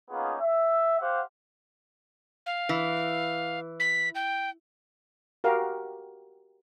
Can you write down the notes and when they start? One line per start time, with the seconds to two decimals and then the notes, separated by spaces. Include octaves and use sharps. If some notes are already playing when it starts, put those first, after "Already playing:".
0.10 A#3 B3 C#4 D#4 F4 G#4
0.40 E5
0.99 G4 C5 F5 F#5
2.46 F5
2.69 E3
3.80 B6
4.15 G5
5.44 F#4 G4 A#4 F5